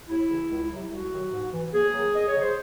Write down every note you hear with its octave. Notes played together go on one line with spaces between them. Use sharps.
D#2 E4
C#3 E3
C#2
C3 F#3
C2 F#4
C3 D#3 F#3
G#2
E3
D#2 G#4
D#3 F#3
E2 D#5
C#5
C#3 F#3
C5